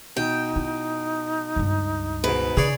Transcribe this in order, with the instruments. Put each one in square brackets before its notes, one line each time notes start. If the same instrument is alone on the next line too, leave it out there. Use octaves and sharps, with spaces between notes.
[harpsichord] B2 [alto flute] D#4 [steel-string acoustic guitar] G5
[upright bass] E4
C#2 G2
[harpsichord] G#2 B2 [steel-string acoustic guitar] B4
[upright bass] C#3 [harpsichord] G#4 C#5 D5